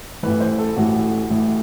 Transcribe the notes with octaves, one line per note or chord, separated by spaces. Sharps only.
A1 A2 E3 B4
C5
A4
A1 A2 E3 F#4
A1 A2 E3